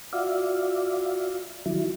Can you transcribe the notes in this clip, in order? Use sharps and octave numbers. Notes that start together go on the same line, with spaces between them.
F4 F#4 D5 E5 F5
D#3 F3 F#3 E4